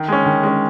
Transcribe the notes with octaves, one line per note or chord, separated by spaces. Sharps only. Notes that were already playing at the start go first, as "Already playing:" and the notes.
Already playing: D#3
G#3 C#4
D#3
G#3 C#4